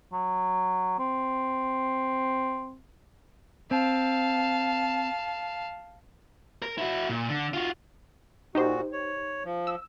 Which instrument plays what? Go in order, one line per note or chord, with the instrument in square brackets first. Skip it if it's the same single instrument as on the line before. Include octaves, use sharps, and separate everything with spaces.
[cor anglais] F#3
C4
[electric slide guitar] C4 [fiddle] F5 A5
[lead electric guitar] A#4
E4 F#4
A#2
D3
F4 F#4
[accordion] A#2 F#4 [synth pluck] D#4 G4 C5
[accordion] C#5
F3
[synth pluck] E6